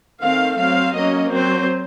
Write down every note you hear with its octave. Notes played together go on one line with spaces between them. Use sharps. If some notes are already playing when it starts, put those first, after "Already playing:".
D#3 A3 C4 F5
F#3 C4 F5
F#3 A#3 C#4 D#5
F#3 C4 C5